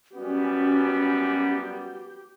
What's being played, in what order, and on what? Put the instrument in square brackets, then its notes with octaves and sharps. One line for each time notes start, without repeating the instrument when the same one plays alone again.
[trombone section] F#2 G3 B3 [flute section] C#4 [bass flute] F#4 [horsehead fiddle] G4